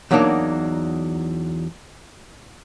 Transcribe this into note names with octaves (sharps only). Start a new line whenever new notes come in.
E2 F#3 A#3 D4 D#4